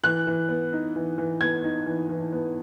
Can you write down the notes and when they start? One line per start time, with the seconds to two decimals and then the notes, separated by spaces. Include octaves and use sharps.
0.03 E3 F#6
0.27 E3
0.49 B3
0.73 D#4
0.96 E3
1.18 E3
1.41 B3 G#6
1.64 D#4
1.86 E3
2.09 E3
2.32 B3